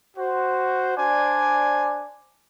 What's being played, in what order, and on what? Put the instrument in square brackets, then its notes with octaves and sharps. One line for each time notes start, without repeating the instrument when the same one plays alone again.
[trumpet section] F#4 C5
D4 C5 D5 G#5